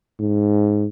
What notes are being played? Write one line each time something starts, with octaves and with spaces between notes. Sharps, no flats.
G#2